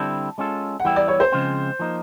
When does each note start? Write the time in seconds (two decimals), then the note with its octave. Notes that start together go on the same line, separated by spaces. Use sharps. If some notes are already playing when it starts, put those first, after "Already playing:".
Already playing: D3 G3 C4 E4 A5
0.38 G#3 C#4 F4 A4
0.80 F#5
0.85 E3 G3 B3 E4 G5
0.96 D5
1.08 C#5
1.20 C5
1.32 C#3 F3 G#3 C4 F4
1.79 F3 A#3 D#4